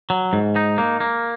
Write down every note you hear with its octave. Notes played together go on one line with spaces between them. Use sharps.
F#3
G#2
D#4
A#3
A#3